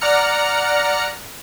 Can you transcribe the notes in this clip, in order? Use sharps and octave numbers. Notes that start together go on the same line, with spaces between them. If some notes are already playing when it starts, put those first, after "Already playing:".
D5 F#5 A#5 F6 C#7